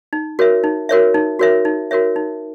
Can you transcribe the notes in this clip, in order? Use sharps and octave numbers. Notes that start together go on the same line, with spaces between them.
D#4
F#4 A#4 C#5 E5
D#4
F#4 A#4 C#5 E5
D#4
F#4 A#4 C#5 E5
D#4
F#4 A#4 C#5 E5
D#4